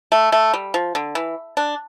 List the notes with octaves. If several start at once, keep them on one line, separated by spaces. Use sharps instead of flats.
A3
A3
G3
F3
D3
E3
D4